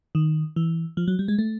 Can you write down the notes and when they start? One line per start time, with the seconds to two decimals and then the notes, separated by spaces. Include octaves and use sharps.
0.15 D#3
0.56 E3
0.97 F3
1.08 F#3
1.19 G3
1.28 G#3
1.38 A3